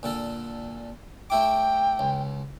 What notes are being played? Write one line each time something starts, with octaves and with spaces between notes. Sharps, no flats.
A#2 D3 A4
A3 E4 G5 D6
C#2